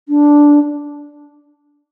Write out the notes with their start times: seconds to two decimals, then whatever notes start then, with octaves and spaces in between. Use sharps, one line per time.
0.08 D4